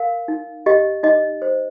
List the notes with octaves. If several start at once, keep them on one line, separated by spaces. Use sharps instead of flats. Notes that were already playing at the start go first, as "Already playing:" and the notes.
Already playing: A#4 F5
D#4
G4 D#5
D#4 D#5
C5